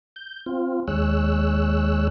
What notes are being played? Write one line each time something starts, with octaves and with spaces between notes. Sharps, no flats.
G6
C4 F4
D#2 G#3 C#5 E6 F#6